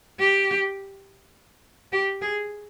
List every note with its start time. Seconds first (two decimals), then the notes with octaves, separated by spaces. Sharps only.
0.20 G4
1.92 G4
2.22 G#4